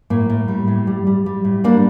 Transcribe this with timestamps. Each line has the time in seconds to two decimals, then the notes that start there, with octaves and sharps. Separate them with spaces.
0.10 A2 A#3
0.30 A2
0.48 G3
0.67 A2
0.87 G3
1.07 G3
1.26 G3
1.45 A2
1.64 G3 A#3 D4